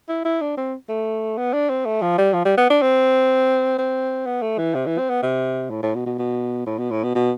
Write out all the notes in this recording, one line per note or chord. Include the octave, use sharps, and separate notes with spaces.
E4
E4
D4
C4
A3
B3
D4
C4
A3
F3
G3
F3
G3
B3
D4
C4
C4
B3
A3
E3
C3
E3
C4
B3
C3
A2
A2
B2
B2
B2
A2
B2
A2
B2
B2